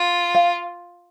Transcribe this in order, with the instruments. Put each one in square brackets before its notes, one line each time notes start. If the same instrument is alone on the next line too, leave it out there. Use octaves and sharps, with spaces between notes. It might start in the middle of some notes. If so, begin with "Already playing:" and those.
Already playing: [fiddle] F4
[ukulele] F5